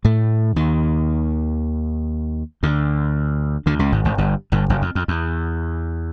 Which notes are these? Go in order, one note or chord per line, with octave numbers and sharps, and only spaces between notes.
A2 A3
D#2 D#3
D2 D3
D2 D3
C#2 C#3
G#1 G#2
G#1 G#2
G1 G2
G1 G2
F#1 F#2
F2
F2
E2